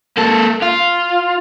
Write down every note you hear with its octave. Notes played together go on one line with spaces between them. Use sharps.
A#3 A4
F4